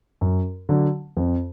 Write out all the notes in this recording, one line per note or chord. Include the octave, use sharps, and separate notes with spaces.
F#2
D3 F#3
F2